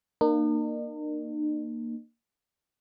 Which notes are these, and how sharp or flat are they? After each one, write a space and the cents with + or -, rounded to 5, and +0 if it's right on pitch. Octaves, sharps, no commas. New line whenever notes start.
A#3 +0 D#4 -45